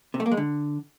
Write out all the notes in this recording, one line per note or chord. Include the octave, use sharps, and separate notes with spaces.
C3
A3
A#3
G#3
D3